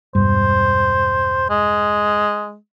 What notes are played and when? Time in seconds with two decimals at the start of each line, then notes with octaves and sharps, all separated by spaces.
0.15 E1 G2 C5
1.50 G#3